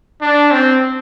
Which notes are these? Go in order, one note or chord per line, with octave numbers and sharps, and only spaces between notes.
D4
C4